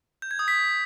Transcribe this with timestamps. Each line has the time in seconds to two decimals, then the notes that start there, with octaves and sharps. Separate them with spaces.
0.22 G6
0.31 G#6
0.39 D#6
0.48 B6